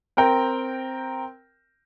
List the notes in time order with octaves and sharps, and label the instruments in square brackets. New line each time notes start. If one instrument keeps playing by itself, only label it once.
[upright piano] C4 A#4 G5